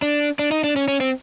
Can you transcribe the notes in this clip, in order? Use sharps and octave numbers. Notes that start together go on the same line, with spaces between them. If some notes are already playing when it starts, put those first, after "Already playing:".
D4
D4
D#4
D4
C#4
C#4
C4